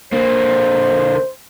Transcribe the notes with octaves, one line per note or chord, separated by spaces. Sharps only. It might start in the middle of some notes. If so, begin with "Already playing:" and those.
D3 A#3 C5